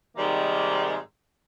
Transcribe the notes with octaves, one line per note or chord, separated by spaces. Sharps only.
G#2 C3 D#3 G3 G#3 A#3